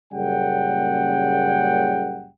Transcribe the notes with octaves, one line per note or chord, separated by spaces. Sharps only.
F#1 A#2 C#3 G3 F#5 G5